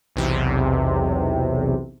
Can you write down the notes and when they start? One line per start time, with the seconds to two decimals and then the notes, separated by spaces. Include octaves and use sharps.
0.16 B1 E2 C3